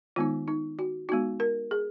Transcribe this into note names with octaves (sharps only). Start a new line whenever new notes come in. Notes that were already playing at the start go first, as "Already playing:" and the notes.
D#3 G#3 B3 D#4 F4
D#4
F#4
G#3 B3 D#4 F#4
A#4
G#4